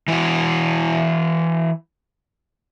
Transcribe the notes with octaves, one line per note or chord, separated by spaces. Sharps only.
E3 E4 F#4